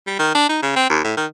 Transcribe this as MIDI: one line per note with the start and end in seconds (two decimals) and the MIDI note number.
0.07 0.19 55
0.19 0.34 51
0.35 0.49 62
0.49 0.60 63
0.62 0.75 49
0.76 0.88 60
0.89 1.03 39
1.04 1.13 45
1.17 1.26 51